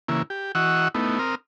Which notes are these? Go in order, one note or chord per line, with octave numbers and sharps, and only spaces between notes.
C#3 E3 A#3 E4
G4
E3 F#4 D#5 F#5 C#6 E6
A3 B3 D#4 E4
C4 A#4 D#6 F6